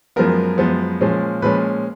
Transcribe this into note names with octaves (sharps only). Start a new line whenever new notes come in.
F#2 F3 G#3 B3 A#4
F#2 F3 G#3 B3
A#2 F3 G#3 C#4
A#2 F3 G#3 C#4 B4